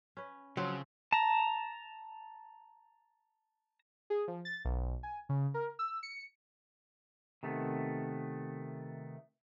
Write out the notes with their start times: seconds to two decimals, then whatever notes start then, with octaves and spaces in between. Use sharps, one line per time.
0.17 C#4 B4
0.57 C#3 F3 F#3 C4
1.13 A5 A#5
4.10 G#4
4.28 F3
4.45 A6
4.65 B1
5.03 G#5
5.29 C#3
5.54 A#4
5.79 E6
6.03 C#7
7.43 C3 D#3 A3 B3